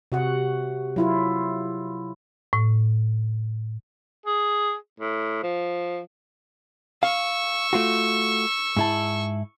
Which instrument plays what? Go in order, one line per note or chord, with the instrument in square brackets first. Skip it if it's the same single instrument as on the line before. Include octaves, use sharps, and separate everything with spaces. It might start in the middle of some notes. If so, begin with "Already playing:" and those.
[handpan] C3 F#4 F#5
F#3 E4 F4
[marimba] A2
[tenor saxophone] G#4
A2
F3
[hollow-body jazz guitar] F5 [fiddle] C#6 E6
[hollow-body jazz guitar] A3 F4 F#4
G#2 E4 A5